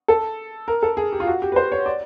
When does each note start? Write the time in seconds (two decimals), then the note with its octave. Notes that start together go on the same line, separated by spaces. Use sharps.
0.08 A4
0.68 A#4
0.83 A4
0.97 G#4
1.12 G4
1.20 F4
1.27 F#4
1.42 G4
1.52 B4
1.56 C5
1.72 C#5
1.86 D5